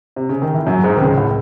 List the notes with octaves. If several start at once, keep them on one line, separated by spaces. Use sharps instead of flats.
C3
C#3
D#3
E3
F#2 F#3
G#2 G#3
D#3
C#2 C#3
A2